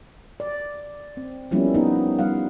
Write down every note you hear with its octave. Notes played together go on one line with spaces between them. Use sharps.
D5
C4
F3 G3 A#3 B3 C#4 E4
B3 D#4
G3 F5 F#5